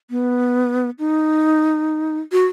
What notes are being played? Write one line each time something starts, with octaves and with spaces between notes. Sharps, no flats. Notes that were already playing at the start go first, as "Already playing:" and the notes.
B3
D#4
F#4